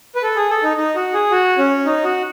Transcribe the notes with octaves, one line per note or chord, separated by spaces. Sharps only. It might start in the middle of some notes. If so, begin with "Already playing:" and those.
B4
A4
G#4
A4
D#4
D#4
F#4
G#4
F#4
C#4
D#4
F#4